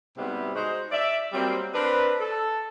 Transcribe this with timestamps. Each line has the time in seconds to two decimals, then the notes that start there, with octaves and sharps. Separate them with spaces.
0.17 G#2 C3 G3 B3 E4 F#4
0.55 G#3 D#4 F#4 C5
0.91 D5 E5
1.33 F#3 G3 A#3 C4
1.74 C4 D4 A#4 B4
2.20 A4